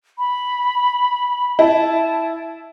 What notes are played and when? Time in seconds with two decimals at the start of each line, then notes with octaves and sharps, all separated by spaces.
0.18 B5
1.59 E4 A5